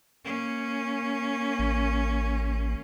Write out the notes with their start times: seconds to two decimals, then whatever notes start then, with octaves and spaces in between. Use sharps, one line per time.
0.25 A#3 C#4
1.59 A1